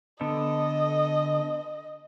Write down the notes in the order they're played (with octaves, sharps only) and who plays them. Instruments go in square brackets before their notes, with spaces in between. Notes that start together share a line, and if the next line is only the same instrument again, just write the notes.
[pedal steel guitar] D3 B3 A4 [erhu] D#5